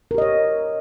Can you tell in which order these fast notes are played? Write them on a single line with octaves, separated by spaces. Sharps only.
A#4 G4 D#5 C#5